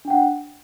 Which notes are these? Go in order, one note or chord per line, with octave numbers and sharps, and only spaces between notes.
D4 F#5 G5